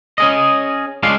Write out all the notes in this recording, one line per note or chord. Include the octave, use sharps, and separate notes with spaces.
C#4 G#4 D#5
G#3 C#4 D4 F4 F5